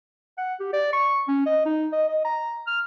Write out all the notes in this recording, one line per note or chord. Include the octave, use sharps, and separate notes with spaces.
F#5
G4
D5
C#6
C#4
D#5
D#4
D#5
D#5
A#5
F6